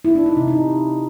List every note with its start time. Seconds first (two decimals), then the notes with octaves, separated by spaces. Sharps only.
0.05 E4
0.15 D4
0.26 D#4
0.37 C3
0.48 D#4